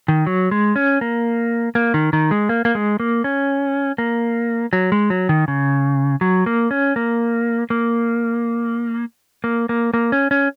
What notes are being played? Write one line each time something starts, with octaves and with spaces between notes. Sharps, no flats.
D#3
F#3
G#3
C#4
A#3
A#3
D#3
D#3
G#3
A#3
A#3
G#3
A#3
C#4
A#3
F#3
G#3
F#3
D#3
C#3
F#3
A#3
C#4
A#3
A#3
A#3
A#3
A#3
C#4
C#4